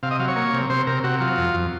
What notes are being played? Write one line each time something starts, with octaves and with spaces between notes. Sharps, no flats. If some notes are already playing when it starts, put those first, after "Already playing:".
C3 F5
D#5
F#3 F5
C#5
A#3
C3
C3 C5
C3 A#4
C3 F#4
F#3 F4
F2
F2